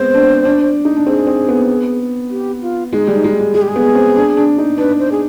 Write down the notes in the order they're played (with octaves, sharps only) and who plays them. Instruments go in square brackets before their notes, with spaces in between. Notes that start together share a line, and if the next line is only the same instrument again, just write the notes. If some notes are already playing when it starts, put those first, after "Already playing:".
Already playing: [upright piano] G#3 B3 C4 [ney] C5
[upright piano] D4
D4
D#4
D4
[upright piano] C4 [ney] G#4
[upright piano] C4
B3
[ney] G4
F4
[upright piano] G#3 [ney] D#4
[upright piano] G3
[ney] D#4
[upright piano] G#3
G#3
[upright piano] G#3 [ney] G#4
[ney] G4
G#4
[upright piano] B3
C4
D4
D4
D#4
[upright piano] D4 [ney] B4
[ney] C5
G#4